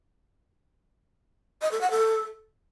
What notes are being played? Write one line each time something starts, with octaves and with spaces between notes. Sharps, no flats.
D#5
A4
F#5
A4